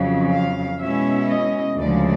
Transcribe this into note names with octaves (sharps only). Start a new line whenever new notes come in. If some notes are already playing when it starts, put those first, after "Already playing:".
Already playing: F2 C#3 F#3
F5
B2 G#3 C#4 E4 E5
D#5
D2 C#3 F3 G#3 D5